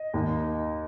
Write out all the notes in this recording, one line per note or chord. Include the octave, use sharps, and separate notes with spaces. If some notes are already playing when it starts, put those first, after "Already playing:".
Already playing: D#5
D#2